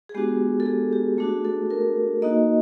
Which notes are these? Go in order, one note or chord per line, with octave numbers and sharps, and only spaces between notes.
G#4
G#3 B3 D4 F#4 G4
A4
G#4
G4
A3 D4 F#4 G#4
A4
A#4
A#3 D#4 F#4 D#5